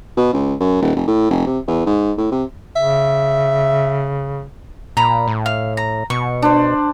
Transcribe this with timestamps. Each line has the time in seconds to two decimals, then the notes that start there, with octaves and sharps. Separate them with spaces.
0.17 B2
0.33 C#2
0.60 F#2
0.82 D#1
0.96 F1
1.08 A2
1.30 F1
1.47 C3
1.68 E2
1.87 G#2
2.18 A2
2.32 C3
2.76 C#3 E5
4.97 A#2 A#5 B5
5.27 A2
5.46 F5
5.77 A#5
6.10 B2 C#6
6.42 D4 C5